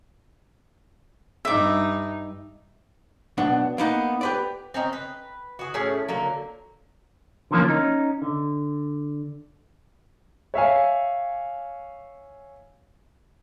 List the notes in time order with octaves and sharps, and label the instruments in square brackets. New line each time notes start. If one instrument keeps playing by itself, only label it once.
[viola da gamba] G2 D#4 [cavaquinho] E5 D6
[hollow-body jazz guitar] B1 B3 D4
A#3 B3 D#4
G4 B4 D5
[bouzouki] C4 C#4 D#4
B4
F#4 G#4
A2 C#4 G#4 A5
D3 F#3 A#3
[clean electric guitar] D3 E3 F3 A#3 C#4
C#4 D#4
D3
[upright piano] C#5 E5 F5 G#5